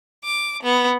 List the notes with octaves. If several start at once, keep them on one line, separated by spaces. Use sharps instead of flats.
D6
B3